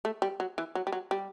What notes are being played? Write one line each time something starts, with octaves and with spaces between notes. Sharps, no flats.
A3
G3
F#3
E3
F#3
G3
F#3
G3